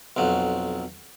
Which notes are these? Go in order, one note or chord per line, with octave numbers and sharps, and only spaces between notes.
B1 F2 F#3